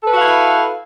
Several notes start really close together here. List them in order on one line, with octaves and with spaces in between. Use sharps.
A4 B4 F#4 F5 E4